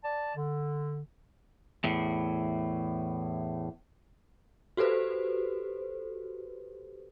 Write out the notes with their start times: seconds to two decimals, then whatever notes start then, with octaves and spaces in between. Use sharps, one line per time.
0.03 D5 A5
0.35 D3
1.84 E2 A2
4.77 F#4 G4 A4 B4 C5